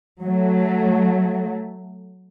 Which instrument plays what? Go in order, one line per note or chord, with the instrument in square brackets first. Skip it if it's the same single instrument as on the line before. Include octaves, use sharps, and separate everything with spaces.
[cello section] F#3 A3